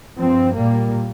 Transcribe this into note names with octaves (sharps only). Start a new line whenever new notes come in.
G2 F3 C4
A#2 G3 A#3